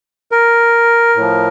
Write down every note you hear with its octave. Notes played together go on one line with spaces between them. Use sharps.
A#4
A2 F3